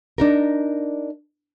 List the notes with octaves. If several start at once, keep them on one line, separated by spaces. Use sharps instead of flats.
D4 D#4 A#4